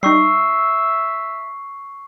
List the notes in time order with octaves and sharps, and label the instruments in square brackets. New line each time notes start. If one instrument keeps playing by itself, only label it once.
[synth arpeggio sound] G3 D#4 [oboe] E5 [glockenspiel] C#6 E6 C7